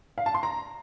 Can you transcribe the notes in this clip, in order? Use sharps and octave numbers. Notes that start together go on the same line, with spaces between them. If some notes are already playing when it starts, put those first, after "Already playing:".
F5
A5
C6
A#5